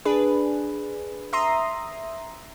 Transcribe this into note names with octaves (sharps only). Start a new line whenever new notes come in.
D4 G#4 B4
E5 A#5 C6 D#6